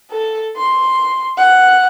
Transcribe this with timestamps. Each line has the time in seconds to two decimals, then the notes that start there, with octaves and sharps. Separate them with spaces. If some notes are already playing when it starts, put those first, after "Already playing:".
0.11 A4
0.57 C6
1.37 F#5